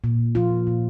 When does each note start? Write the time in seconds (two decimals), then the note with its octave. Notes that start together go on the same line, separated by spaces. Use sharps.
0.04 A#2
0.35 F3 A#3 F4
0.67 A#2